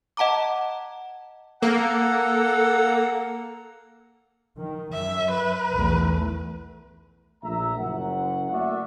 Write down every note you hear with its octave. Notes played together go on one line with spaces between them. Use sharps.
D#5 F#5 A5 A#5 D6
A#3 A4 F#5 A#5
D#3
F#2 E5
B4
B1 E2 A3
A#1 A3 E5 A#5
F#1 F#2 F#5
A3 A#3 F#4 D5 E5